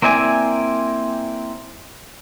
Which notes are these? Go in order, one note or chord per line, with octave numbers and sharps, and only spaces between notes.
A#3 C4 E4 D5 G#5